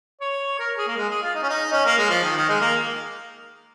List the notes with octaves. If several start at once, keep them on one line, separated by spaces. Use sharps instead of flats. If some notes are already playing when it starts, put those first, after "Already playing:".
C#5
A#4
G#4
A#3
G#3
G#4
F4
D#4
C#4
D#4
C#4
A#3
G#3
F3
D#3
D#3
G#3
A#3